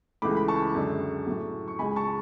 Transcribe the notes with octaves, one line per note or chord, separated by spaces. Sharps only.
C#2 C#3 E3 A3 B5 D6
B5
A5 C#6
F#2 D3 G#3
A2 F#3 A3
C#6
C#2 C#3 G#3 G#5 B5
A5 C#6